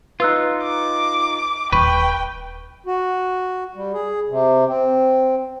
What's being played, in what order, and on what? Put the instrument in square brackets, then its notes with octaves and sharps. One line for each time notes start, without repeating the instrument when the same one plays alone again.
[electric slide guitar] D#4 F4 [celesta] B4 E6 F#6
[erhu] D6
[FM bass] D#1 [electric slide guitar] B4 [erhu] G5 [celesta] B5 C#6
[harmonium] F#4
G3
G#4
C3
C4